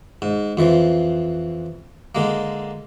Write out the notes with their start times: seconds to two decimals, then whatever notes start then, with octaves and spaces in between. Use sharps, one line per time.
0.22 G#2
0.57 F2 E3 F3
2.15 D3 G#3 A#3